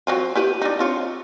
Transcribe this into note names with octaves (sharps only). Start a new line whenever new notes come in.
F#3 C4 F4
E4 G4 B4
D4 D#4
C4 F4 C#5